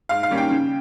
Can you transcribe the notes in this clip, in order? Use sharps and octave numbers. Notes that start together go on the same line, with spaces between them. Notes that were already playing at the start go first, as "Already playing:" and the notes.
G#2 F5
F5
D#3 G3 A#3 C#4
G5
C#3